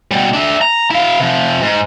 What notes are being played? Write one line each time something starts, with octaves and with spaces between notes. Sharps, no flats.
B2 G3
D4 E5
A#5
E4 F5
C3 F3
G#2